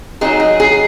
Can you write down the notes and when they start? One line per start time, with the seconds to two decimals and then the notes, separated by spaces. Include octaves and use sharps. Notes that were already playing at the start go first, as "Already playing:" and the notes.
0.21 A#2 F#3 B3 D#4 G#4
0.40 G#4
0.60 G#4